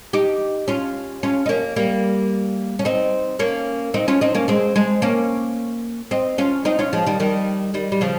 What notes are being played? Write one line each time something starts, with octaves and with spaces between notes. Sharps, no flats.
D#4 G4
C#4 F4
C#4 F4
D#4
A#3 C#4
G3 A#3
C#4
C4 D#4
A#3 C#4
C4 D#4
C#4 F4
C4 D#4
A#3 C#4
G#3 C4
G#3 C4
A#3 C#4
C4 D#4
C#4 F4
C4 D#4
C#4 F4
F3 G#3
D#3 G3
D#3 G3
D#3 G3
G3
C#3 F3